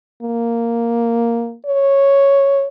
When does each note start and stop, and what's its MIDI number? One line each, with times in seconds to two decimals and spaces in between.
0.22 1.56 58
1.66 2.68 73